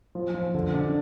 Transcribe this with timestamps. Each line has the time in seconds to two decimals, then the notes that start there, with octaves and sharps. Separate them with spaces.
0.15 F3
0.34 F3
0.54 D3
0.74 D4